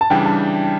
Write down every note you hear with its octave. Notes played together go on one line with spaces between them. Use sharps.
A5
C#3 E3 G3 D4 G5
A5